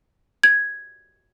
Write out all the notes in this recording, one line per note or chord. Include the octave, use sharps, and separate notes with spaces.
G#6